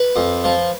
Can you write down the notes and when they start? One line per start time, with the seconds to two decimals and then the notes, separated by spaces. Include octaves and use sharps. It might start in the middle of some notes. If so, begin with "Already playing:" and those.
Already playing: B4
0.16 F2
0.44 F3